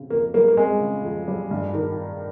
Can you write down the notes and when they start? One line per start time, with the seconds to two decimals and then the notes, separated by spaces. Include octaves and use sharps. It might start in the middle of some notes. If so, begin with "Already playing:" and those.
Already playing: C#3 C4
0.10 F2 A#3
0.34 G3 A#3
0.48 A#3
0.57 G#3 C4
0.81 C#3
1.05 F2
1.28 G3
1.51 G2
1.73 D#3